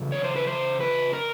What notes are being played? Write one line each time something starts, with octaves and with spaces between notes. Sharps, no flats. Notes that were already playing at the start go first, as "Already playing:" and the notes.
Already playing: E2 C#3
C#5
C5
B4
C5
B4
A#4